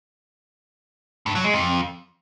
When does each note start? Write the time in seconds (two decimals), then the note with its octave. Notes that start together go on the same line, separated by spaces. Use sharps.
1.26 G2
1.35 F#3
1.44 G#3
1.54 F2